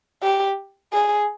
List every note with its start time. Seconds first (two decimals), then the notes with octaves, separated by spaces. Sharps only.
0.23 G4
0.93 G#4